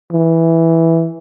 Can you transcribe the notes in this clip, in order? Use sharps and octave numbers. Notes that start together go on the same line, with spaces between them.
E3